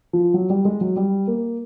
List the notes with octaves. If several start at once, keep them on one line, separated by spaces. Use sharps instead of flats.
F3
F#3
G3
G#3
F#3
G3
A#3